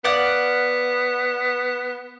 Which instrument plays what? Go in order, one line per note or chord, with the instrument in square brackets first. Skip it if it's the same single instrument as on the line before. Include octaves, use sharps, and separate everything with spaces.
[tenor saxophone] B3 [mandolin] D5 F5 F#5